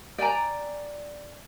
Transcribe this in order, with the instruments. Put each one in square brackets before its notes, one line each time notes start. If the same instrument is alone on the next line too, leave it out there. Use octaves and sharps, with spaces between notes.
[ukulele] D5 G5 G#5 A#5